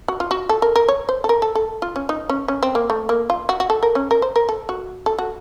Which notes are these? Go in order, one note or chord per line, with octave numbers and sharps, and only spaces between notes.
F#4
F4
F#4
A4
A#4
A#4
C#5
C5
A4
A#4
A4
A4
F4
C#4
D#4
C#4
C#4
C4
A#3
A3
A#3
F4
F#4
F#4
A4
A#4
C#4
A#4
C5
A#4
A4
F#4
A4
F#4